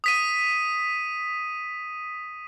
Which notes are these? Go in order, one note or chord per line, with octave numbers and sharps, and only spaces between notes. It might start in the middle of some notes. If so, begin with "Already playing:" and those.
D#6 B6 D#7